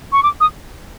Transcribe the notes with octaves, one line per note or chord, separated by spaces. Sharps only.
C#6
D6
D#6